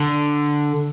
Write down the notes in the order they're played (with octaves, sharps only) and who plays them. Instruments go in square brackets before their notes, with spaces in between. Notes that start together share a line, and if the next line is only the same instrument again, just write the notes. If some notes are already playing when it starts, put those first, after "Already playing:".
Already playing: [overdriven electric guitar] D3